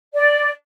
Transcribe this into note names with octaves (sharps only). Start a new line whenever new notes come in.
D5